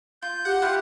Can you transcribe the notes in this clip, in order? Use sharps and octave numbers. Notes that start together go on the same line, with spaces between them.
F4 G6
G4 F#5
E4 F4 G4 F5 F#6